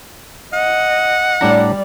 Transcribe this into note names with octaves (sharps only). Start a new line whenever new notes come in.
D#5 F#5
A2 G3 D4 D5 A#5